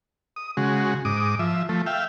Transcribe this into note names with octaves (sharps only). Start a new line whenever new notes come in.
D#6
C#3 G#3 F#4
G#2 D6 D#6
F3 E5
F3 A3
E5 F5 G5